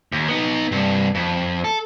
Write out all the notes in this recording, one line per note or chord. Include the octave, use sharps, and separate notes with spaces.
D#2
B3 D#4
G2 C3
F2
A4